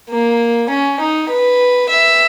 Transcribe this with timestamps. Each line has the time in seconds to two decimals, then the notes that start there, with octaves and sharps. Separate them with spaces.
0.10 A#3
0.69 C#4
1.00 D#4
1.29 B4
1.89 E5